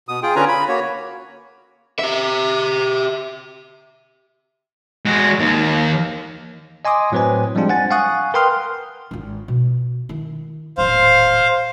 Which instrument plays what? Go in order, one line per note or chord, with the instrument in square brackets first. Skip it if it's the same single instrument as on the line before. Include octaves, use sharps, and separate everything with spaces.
[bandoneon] B2 D#6
F4 G#4 G5
D3 C#4 F4 B4 G#5 A#5
B5
A#3 F#4 C#5
[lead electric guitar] G4 E5
[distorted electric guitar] G#3 F#4
D#2
[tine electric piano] D#5 G#5 C6 D6 D#6
A2 F#3 C4 B4 C5 G#5
F3 G3 G#3 C4 D4 F4
F#5 G#5 A6
F5 F#5 G#5 C#6 D#6 F#6
A#4 B4 G5 C6 D#6 F6
[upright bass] G#1 F4
B2
D#3 E4
[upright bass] D#1 A1 [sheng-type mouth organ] C5 F5